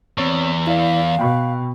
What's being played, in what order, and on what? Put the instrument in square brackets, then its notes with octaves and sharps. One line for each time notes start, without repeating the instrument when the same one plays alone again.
[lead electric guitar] E2 [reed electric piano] C4 C#5 C#6
[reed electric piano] E4 D5 [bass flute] F5
[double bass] B2 [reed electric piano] G5 B5 C#6